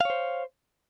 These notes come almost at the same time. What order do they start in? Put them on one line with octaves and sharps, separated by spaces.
F5 C#5 C5